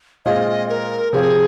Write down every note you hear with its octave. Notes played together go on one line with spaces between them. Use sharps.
A#2 G#3 C4 F4 G#4 D#5
A#4
C3 F3 C4 G#4